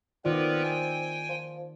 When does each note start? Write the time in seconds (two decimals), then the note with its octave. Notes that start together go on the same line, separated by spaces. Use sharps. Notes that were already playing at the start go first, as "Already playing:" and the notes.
0.25 D#3 B3 C4 F4 A#4 B4 D5
0.63 G5 G#5
1.29 F3